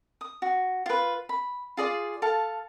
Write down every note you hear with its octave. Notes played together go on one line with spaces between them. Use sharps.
D#6
F#4
F4 B4
B5
F4 G#4 D5
A4 F5 A5